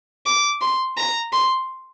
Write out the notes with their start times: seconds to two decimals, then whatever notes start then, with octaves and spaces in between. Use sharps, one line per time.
0.26 D6
0.61 C6
0.97 A#5
1.33 C6